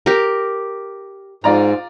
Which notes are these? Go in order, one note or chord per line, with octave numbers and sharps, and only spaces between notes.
G4 A#4
G#2 F4 D5 A#5